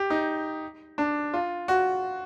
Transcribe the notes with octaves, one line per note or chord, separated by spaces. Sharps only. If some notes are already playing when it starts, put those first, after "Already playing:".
Already playing: G4
D#4
D4
F4
F#4